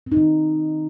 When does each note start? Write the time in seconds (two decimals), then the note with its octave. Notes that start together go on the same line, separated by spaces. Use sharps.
0.06 C4
0.12 D#4
0.17 D#3